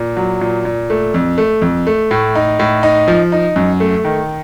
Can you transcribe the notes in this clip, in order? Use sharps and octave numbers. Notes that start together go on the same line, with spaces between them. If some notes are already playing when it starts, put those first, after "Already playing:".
Already playing: A#2
F#3
A#2
A#2
A3
F2
A3
F2
A3
A2
D#4
A2
D#4
F3
D#4
F#2
A3
D#3